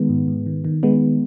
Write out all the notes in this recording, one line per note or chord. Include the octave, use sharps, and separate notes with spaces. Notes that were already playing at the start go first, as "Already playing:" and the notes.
Already playing: D#3 G#3 B3
G#2
G#2
D#3
D#3
D#3 G#3 B3